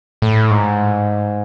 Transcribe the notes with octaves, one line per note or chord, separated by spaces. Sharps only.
A2
G#2